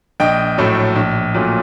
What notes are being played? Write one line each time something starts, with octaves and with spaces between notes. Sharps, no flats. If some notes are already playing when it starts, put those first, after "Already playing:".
A#1 D#5 G5
A2 F#3 A3
A#1
A#2 F#3 A3